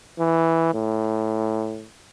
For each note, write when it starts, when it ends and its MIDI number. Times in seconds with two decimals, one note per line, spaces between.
0.19 0.73 52
0.74 1.87 45